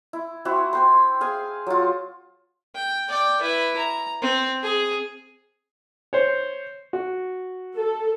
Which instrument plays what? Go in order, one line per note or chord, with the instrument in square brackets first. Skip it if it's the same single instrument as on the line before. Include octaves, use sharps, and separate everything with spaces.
[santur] E4
C4 E4 F#4
C5 G5 C6
G#4 F5 G#5
F#3 F4
[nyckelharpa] G5
D5 G5
E4 B4
A#5
C4
G#4
[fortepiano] C5 C#5
F#4
[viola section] A4